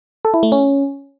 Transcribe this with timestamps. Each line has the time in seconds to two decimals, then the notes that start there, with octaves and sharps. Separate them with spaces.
0.25 A4
0.34 E4
0.43 A3
0.52 C#4